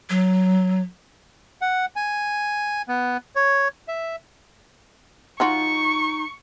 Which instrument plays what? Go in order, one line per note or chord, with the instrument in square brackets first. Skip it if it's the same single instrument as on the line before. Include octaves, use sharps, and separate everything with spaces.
[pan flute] F#3
[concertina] F#5
G#5
B3
C#5
E5
[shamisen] F3 F4 F#4 [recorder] D#4 [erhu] C#6